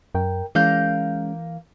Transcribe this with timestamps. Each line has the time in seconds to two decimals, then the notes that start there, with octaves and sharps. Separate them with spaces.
0.15 F#2 A#4 G5
0.55 E3 G#3 A#3 C#4 F5 G6